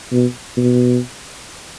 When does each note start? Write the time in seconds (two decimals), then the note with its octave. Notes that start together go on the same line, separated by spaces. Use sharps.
0.11 B2
0.57 B2